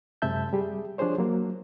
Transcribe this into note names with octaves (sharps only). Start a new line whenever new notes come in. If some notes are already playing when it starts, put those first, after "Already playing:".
F#2 C3 G#3 E5 A5 G6
G3 G4 G#4
F3 D4 G4 G#4 C5 C#5
F#3 A#3